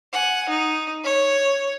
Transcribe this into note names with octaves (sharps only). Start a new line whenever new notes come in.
F#5 G#5
D#4
C#5